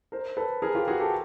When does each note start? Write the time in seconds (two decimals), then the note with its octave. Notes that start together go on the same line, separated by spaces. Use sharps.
0.12 A#4 C5
0.37 A4 B4
0.62 G#4 A#4
0.75 F4 G4
0.88 F#4 G#4
1.00 G4 A4